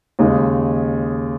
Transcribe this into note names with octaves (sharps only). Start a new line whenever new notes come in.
D#2 C#3 G#3 D#4